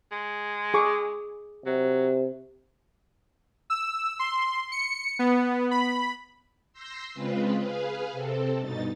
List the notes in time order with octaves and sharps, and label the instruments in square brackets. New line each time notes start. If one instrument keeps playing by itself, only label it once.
[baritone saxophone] G#3
[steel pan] G#4 C#6 D6
[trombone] C3 [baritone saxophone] F#3
[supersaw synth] E6
C6
C#7
B3
B5
[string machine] C6 E6 G6 A#6 C7
C#3 G#3 C4 F4 B4
G#4 B4 F5
C3 C4 A4
G2 B2 D#4 A6